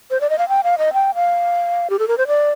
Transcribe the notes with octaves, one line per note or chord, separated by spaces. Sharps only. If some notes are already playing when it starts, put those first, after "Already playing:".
C5
D5
D#5
F5
G5
F5
D#5
G5
F5
G4
A4
A#4
C5
D5